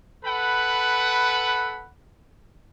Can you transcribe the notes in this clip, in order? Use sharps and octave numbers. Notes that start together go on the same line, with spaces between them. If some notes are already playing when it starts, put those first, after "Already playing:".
A4 B4 F#5 B5